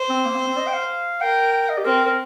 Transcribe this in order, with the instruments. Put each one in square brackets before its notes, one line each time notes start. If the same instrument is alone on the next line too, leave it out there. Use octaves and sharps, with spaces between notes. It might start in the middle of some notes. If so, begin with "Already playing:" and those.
Already playing: [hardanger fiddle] C5
[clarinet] C4
A#3
C4
C4
D#5
G5
F5
[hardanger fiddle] A#4 [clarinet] G5
[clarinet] G5
D#5
G4
[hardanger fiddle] C4 [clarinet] A#4
[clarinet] A#4